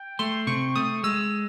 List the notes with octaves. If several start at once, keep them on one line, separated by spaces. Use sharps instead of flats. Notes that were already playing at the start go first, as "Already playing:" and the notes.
Already playing: G5
A3 C6
C3 C#6
A3 D#6
G#3 E6